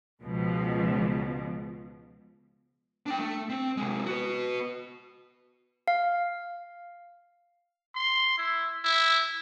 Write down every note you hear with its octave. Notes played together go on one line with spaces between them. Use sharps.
C#2 B2 F3
D4 G5
A3
C4
C3 G#3
F#4 B4
F5
C6
E4
E4